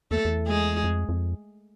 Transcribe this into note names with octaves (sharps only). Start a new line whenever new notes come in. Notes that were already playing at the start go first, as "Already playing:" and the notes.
E2 A3 A4
E2
G#3 G#4
F2
F2